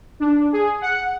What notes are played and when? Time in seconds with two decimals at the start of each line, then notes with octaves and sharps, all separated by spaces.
0.20 D4
0.52 G#4
0.81 F#5